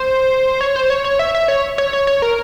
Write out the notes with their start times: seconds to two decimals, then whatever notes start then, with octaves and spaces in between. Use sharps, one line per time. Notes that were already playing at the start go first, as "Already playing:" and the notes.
Already playing: C5
0.61 C#5
0.76 C5
0.90 C#5
1.04 C#5
1.19 E5
1.35 E5
1.48 C#5
1.78 C#5
1.93 C#5
2.07 C#5
2.22 A#4